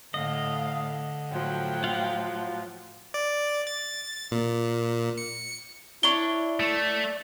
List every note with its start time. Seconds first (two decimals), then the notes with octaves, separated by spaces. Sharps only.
0.14 A2 D3 D#5 F5
1.31 A2 F3 F#3 G5
1.84 F4 F5 F#5
3.14 D5
3.67 A6
4.32 A#2
5.18 C#7
6.03 D4 E4 C#5 G7
6.60 A3